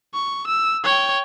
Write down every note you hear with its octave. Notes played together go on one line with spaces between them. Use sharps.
C#6
E6
C#5 G5